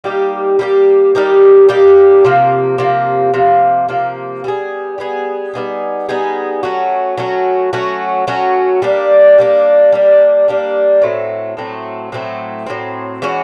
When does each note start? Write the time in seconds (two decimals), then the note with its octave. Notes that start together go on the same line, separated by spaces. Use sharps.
0.04 G3 A#3 D#4 G4
0.59 G3 A#3 D#4 G4
1.15 G3 A#3 D#4 G4
1.69 G3 A#3 D#4 G4
2.25 C3 F3 A#3
2.78 C3 F3 A#3
3.34 C3 F3 A#3
3.88 C3 F3 A#3
4.44 G3 B3 D#4 G#4
4.98 G3 B3 D#4 G#4
5.53 G3 B3 D#4 G#4
6.09 G3 B3 D#4 G#4
6.63 F#3 A3 C#4 F#4
7.17 F#3 A3 C#4 F#4
7.73 F#3 A3 C#4 F#4
8.27 F#3 A3 C#4 F#4
8.82 G3 A#3 D4
9.38 G3 A#3 D4
9.92 G3 A#3 D4
10.48 G3 A#3 D4
11.02 A2 F#3 A3 C4
11.57 A2 F#3 A3 C4
12.12 A2 F#3 A3 C4
12.66 A2 F#3 A3 C4
13.22 E3 G#3 C#4 F#4